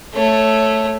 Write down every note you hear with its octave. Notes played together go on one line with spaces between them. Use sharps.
A3 C#5